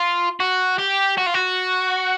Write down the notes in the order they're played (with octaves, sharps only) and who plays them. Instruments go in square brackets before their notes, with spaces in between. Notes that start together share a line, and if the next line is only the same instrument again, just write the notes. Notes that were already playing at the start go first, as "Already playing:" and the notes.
Already playing: [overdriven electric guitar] F4
F#4
G4
F#4
F4
F#4